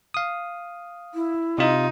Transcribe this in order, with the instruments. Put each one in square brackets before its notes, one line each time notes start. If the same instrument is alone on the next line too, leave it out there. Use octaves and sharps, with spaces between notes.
[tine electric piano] F5 D#6
[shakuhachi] E4
[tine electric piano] C3 F4 [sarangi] D#4